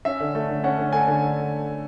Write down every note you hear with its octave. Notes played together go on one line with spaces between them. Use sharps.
C#4 E5
D3
A3
D3
C#4 F#5
D3
A3 G#5
D3